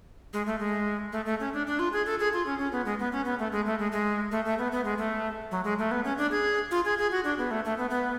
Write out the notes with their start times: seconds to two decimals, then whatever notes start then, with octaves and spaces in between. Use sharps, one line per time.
0.33 G#3
0.46 A3
0.59 G#3
1.12 A3
1.26 A3
1.40 C#4
1.53 D4
1.66 D4
1.79 F4
1.92 G#4
2.06 A4
2.19 G#4
2.33 F4
2.46 C#4
2.59 C#4
2.72 B3
2.85 G#3
2.99 B3
3.12 C#4
3.25 B3
3.39 A3
3.52 G#3
3.66 A3
3.79 G#3
3.92 G#3
4.31 A3
4.45 A3
4.58 B3
4.72 B3
4.85 G#3
4.98 A3
5.51 F#3
5.64 G#3
5.79 A3
5.91 B3
6.04 C#4
6.17 D4
6.31 G#4
6.71 F4
6.85 G#4
6.98 G#4
7.11 F#4
7.24 D4
7.38 B3
7.51 A3
7.65 A3
7.78 B3
7.90 B3